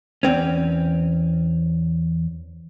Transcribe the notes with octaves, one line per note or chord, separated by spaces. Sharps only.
E2 C4 C#4